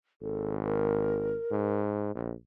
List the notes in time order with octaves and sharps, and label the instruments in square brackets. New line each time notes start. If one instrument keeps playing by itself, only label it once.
[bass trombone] G#1 [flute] A4
[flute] A#4
[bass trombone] G#2
A#1